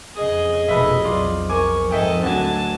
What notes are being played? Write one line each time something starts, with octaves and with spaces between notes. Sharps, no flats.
F2 C#3 G#4 D#5
F1 B2 A4 B4 E5
B1 F2 F4 D5
A#4 G#5 C#6 D6
F2 G#2 A4 D#5 E5 G5 G#5
D2 D3 F#3 G#5 A5